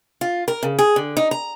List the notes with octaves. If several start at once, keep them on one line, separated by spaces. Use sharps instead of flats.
F4
A#4
C#3
G#4
D3
D#4
A#5